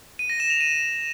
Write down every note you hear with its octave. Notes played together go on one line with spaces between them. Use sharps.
D#7
A#6
E7
F7
D#7